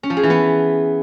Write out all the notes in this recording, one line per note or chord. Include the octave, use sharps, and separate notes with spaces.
C#4
F3
G#4
E3
B3